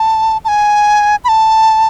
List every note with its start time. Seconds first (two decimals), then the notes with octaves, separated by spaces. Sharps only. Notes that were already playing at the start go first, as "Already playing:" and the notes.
Already playing: A5
0.45 A5
0.48 G#5
1.24 B5
1.29 A5